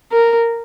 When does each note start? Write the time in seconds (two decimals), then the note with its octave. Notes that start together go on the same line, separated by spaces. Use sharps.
0.12 A#4